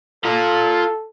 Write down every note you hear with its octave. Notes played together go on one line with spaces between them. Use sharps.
F4 A4 A#5